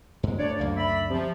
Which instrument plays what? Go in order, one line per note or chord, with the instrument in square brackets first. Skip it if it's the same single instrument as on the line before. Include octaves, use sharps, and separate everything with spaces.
[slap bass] G2 G#3
[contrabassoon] D2 [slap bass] D4 [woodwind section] C#5 D5
[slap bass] C#2 F#2 D3 [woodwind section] A#3
[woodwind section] D5 E5 B5
[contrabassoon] C3 [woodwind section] F3